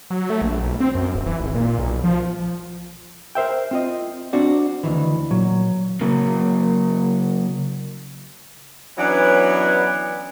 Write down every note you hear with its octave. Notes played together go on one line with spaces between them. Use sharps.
F#3
A3
A#1
B1
C4
F#2
D1
E3
G#1
A#2
B1
F3
A#4 C5 E5 G5
C4 F4 D#5
C4 D4 F#4 D5
D2 D#3 E3
A#2 F#3
C#3 F#3 A#3
E3 F#3 B3 C#4 D4